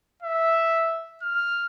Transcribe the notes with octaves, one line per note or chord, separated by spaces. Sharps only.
E5
F6